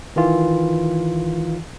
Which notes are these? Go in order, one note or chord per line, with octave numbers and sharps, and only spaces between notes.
D#3 E3 F4